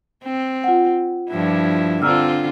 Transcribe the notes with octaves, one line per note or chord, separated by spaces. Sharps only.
C4
F4 F#5
G2 F3 E4
D3 C4 F4 A#5 E6 F6